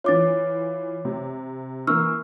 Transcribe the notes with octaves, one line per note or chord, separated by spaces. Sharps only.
E3 F4 C#5 D6 A6
C3
E3 A#3 C#6 E6 F6